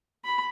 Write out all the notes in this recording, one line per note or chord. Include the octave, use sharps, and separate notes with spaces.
B5